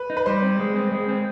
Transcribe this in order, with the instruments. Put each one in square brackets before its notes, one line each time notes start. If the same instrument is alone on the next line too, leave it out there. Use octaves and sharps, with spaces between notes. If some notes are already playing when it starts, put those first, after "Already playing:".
Already playing: [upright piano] B4
[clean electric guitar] D#4
[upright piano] B4
[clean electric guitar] G3 [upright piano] C5
[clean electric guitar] C4
G#3
C4
G#3
C4